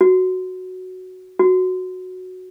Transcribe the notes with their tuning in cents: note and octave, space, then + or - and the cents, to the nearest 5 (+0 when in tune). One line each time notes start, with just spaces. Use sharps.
F#4 +0
F#4 -5